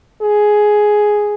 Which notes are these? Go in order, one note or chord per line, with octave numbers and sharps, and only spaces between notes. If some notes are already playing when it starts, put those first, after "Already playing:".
G#4